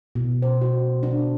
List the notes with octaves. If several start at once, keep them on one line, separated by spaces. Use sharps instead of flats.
B2
C5
F#4
D4